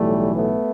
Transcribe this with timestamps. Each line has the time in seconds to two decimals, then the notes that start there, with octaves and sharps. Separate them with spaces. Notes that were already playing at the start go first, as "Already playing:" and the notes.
Already playing: B1 A2 E3 G3 A3
0.34 A3 B3